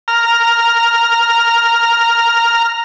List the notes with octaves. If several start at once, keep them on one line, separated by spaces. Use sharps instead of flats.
A#5 F6